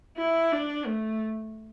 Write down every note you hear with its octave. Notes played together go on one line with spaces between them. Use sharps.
E4
D4
A3